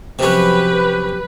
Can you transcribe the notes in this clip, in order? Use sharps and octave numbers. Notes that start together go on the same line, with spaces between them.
C3 F3 F#3 C#4 G4 B4